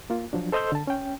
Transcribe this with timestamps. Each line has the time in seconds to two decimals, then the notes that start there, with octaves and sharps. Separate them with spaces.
0.10 A#3 F4
0.33 F3 F#3 D4
0.52 A4 C5 D#5 C6 E6 G6
0.72 D3 A5
0.87 C#4 G5